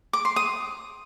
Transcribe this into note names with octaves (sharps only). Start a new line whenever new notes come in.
D6
C6
D#6